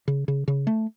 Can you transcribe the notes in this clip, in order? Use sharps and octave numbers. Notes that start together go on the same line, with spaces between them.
C#3
C#3
C#3
A3